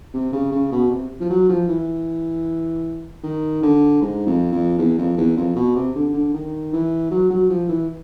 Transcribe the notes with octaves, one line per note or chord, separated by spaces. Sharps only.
C3
C#3
C#3
B2
C3
F3
F#3
F3
E3
D#3
D3
G#2
F2
F2
E2
F2
E2
F2
B2
C3
D3
D3
D#3
E3
F#3
F#3
F3
E3